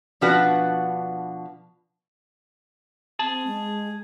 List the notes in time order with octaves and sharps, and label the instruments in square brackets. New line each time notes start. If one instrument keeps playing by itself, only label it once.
[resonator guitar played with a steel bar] B2 F3 D4 F#4 B4
[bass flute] C4 [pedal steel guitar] G#4 A5
[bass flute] G#3